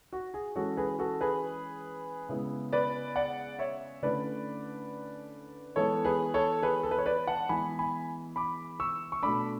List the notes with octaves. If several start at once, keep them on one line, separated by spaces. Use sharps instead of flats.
F#4
G#4
E3 G#3 C#4 E4 F#4 A4
G#4 B4
F#4 A4
G#4 B4
C#3 G#3 B3 E4
B4 D5
D5 F#5
C#5 E5
D3 A3 C#4 E4 B4 D5
E3 G#3 B3 E4 A4 C#5
G#4 B4
A4 C#5
G#4 B4
A4
B4
C#5
B4 D5
F#5 A5
E3 G#3 B3 E4 G#5 B5
G#5 B5
B5 D6
C#6 E6
C#6
B2 A3 D4 B5 D6